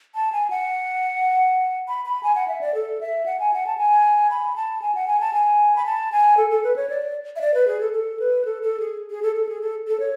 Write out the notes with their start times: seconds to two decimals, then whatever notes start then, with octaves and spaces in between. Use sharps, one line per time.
0.15 A5
0.33 G#5
0.50 F#5
1.88 B5
2.05 B5
2.23 G#5
2.35 F#5
2.48 E5
2.61 D5
2.75 A4
3.01 E5
3.26 F#5
3.40 G#5
3.54 F#5
3.67 A5
3.78 G#5
4.30 B5
4.56 A5
4.82 G#5
4.95 F#5
5.08 G#5
5.20 A5
5.33 G#5
5.76 B5
5.86 A5
6.12 G#5
6.37 A4
6.50 A4
6.64 B4
6.76 C#5
6.90 D5
7.36 E5
7.41 D5
7.54 B4
7.67 G#4
7.81 A4
7.93 A4
8.19 B4
8.45 A4
8.62 A4
8.80 G#4
9.10 G#4
9.23 A4
9.35 A4
9.49 G#4
9.61 A4
9.87 A4
10.00 C#5